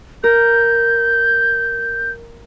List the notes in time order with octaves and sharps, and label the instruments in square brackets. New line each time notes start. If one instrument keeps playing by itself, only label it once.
[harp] A#4 [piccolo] G6